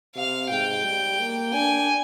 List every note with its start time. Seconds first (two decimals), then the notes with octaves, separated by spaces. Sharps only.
0.16 C3 F5
0.51 G#2 G5
0.85 G3
1.19 A#3
1.54 D4 G#5